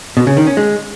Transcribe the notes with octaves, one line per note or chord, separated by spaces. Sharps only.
B2
C#3
D#3
C#4
G#3